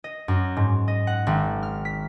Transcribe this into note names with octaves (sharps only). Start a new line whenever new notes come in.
D#5
F#2
G#2
D#5
F#5
G#1
F6
B6